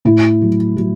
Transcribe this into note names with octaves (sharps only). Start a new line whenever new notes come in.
A2 E4
F#3
F#3